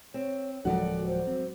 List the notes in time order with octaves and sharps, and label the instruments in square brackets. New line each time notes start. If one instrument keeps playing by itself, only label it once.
[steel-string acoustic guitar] C4 [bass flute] C#5
[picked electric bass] D1 F3 G#3 [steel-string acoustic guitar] D#2 D5 F#5 [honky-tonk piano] F#3 [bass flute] A4
[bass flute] C5
[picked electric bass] C4